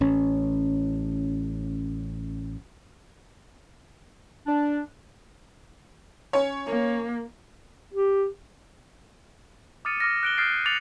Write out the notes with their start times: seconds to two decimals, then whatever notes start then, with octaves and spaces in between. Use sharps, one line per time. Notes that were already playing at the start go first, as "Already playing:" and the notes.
0.01 A1 C#4
4.46 D4
6.33 C#4 C#5
6.67 A#3
7.94 G4
9.85 D6 D#6 F6 A6 C#7 D#7
10.00 D6 F6 A#6
10.23 F#6 D7 G7
10.38 D#6 F6 G6 A6 C7 D7
10.66 D6 A6 C#7 F7 F#7